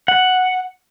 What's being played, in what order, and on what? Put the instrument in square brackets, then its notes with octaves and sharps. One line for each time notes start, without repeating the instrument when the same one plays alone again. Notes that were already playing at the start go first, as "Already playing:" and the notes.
[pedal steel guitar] F#5